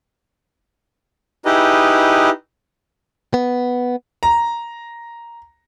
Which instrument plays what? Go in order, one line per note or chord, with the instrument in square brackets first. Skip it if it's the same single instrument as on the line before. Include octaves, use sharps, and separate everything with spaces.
[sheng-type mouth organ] D#4 E4 G4 G#4 B4 D#5
[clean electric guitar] B3
[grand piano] A#5